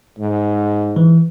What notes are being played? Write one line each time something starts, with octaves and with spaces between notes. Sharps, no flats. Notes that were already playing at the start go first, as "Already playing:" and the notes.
G#2
E3